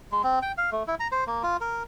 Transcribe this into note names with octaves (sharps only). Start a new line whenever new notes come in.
G#3
C4
G5
F5
A3
E4
A#5
C5
A#3
F4
A#4